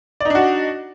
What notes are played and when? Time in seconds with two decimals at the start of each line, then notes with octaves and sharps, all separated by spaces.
0.20 D5
0.25 D#4
0.30 D4
0.35 F#4